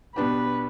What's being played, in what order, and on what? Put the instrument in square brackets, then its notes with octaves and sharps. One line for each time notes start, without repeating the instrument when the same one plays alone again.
[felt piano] B2 B3 D4 G4 [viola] B4